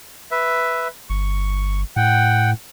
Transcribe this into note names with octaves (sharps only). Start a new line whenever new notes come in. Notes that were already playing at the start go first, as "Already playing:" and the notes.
B4 E5
G1 C#6
A2 F#5 G5